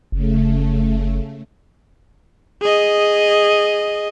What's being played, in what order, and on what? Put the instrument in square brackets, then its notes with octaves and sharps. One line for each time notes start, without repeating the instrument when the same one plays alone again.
[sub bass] F#1 [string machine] C#3 A3
[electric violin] G#4 D#5